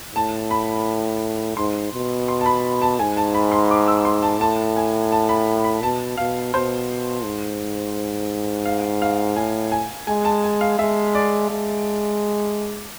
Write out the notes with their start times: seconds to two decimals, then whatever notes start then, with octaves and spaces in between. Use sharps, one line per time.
0.15 A2 A5
0.51 B5
1.57 G#2 C6
1.93 B2
2.28 C6
2.41 A5
2.46 B5
2.82 A5
2.99 G#2 G#5
3.17 A5
3.34 B5
3.52 C6
3.71 D6
3.88 E6
4.05 C6
4.23 A5
4.41 A2 A5
4.77 G#5
5.12 A5
5.29 B5
5.64 B5
5.83 B2 A5
6.17 B2 F5
6.54 B2 C5
7.24 G#2
8.65 F5
9.02 F5
9.36 A2 G#5
9.72 G#5
10.07 G#3 G#5
10.25 A5
10.44 G#5
10.61 F5
10.79 G#3 E5
11.15 D5
11.50 G#3